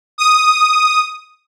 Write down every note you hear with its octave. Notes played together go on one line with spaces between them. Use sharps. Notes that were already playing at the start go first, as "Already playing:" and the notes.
D#6